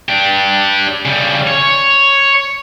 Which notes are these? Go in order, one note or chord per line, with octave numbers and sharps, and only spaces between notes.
D4 G4
C#3 G3
C#5